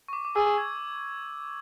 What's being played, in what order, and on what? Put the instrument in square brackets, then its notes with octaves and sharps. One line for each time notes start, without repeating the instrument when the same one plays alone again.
[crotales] C#6
D6
D6
[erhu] G#4 [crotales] E6
[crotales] G#6